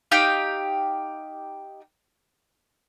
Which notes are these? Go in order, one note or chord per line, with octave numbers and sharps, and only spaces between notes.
D#4 G4 F5 G5